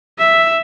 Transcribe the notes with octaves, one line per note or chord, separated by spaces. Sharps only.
E5